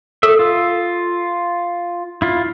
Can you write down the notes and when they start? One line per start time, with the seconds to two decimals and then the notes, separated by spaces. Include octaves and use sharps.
0.23 A4 E5
0.39 F4
2.22 E4 F4